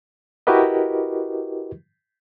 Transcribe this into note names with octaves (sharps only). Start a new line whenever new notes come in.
E4 F#4 G4 A#4 B4 D#5